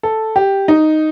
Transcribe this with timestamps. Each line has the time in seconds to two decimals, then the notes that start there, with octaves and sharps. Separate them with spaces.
0.03 A4
0.36 G4
0.68 D#4